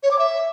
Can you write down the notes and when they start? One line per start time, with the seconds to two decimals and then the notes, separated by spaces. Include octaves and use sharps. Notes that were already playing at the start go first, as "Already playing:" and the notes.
0.03 C#5
0.11 D6
0.19 E5